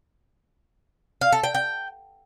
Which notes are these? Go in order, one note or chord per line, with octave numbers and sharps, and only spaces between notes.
F5
A4
G5
G5